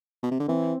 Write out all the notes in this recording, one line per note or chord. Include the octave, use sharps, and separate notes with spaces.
B2
C3
D3
E3 C4